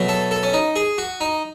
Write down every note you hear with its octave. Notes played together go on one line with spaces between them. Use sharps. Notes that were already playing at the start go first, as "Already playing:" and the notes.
Already playing: B2 F#3 A3
A4
A4
C#4
D#4
G#4
F#4
D#4